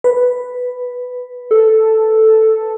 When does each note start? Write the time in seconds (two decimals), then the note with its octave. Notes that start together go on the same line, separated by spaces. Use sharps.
0.04 B4
1.51 A4